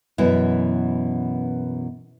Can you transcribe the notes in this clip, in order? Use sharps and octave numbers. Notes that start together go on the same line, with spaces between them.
F#2 B2 E3 B3 E4